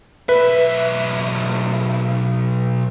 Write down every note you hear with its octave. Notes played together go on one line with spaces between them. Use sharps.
B1 B4 E5